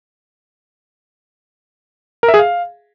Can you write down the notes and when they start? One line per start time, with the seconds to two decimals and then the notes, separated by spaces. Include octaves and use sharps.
2.23 A#4
2.28 E5
2.34 G#4
2.39 F5